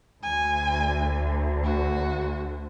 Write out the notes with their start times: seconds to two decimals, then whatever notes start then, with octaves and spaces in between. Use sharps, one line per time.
0.23 D2 G#5
1.64 F#4